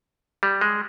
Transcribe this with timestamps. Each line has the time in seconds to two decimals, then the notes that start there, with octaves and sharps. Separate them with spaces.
0.43 G3
0.61 G#3